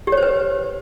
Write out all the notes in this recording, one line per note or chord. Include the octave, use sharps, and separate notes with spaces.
G4
C#5
C5
B4